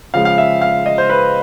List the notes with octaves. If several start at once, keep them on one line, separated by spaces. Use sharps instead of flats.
C#3 F3 G#3 F5
F5
E5
F5
D#5
C5
B4